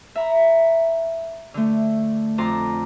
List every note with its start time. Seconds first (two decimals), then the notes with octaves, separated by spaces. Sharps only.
0.15 E5 A#5 B5
1.54 D3 A3
2.38 F2 A5 A#5 C6 D6